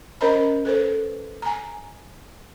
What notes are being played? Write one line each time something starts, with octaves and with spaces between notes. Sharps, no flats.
C#4 A#4 C5 D#5 A#5 B5
A4 B4 C5
G#5 A#5